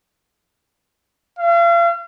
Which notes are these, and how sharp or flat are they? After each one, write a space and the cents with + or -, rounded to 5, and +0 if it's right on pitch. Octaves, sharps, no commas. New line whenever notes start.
F5 -40